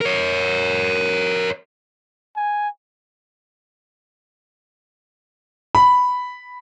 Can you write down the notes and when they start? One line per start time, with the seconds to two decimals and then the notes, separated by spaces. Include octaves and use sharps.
0.01 A#4 C#5
2.36 G#5
5.75 B5